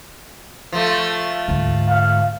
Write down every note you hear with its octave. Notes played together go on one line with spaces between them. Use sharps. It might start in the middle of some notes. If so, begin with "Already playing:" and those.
F3 A3
D2 G#2
F5